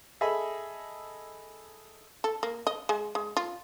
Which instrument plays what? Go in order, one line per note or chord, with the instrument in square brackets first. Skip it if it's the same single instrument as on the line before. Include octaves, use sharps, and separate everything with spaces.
[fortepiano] G#4 A4 D#5 E5 B5
[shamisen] A4
A#3
D#5
G#3
G#3
F4